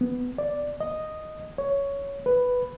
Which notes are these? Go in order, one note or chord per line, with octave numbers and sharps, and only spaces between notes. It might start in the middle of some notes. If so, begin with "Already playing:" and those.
B3
D5
D#5
C#5
B4